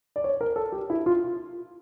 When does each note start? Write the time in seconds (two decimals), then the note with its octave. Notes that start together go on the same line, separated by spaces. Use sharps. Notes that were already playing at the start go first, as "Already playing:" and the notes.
0.16 D5
0.24 C#5
0.41 A#4
0.56 A4
0.72 G4
0.90 E4
1.06 F4